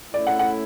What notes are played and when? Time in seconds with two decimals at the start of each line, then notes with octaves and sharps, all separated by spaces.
0.13 A3 C#4 E4 D5
0.27 F#5
0.39 F#5